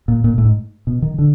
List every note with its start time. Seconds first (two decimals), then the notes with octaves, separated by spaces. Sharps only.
0.08 A#2
0.24 A#2
0.38 A2
0.45 G#2
0.87 B2
1.02 D#3
1.19 D3